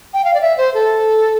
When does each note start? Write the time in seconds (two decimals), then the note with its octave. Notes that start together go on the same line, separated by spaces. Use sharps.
0.14 G5
0.25 F5
0.34 D5
0.41 E5
0.58 C5
0.74 A4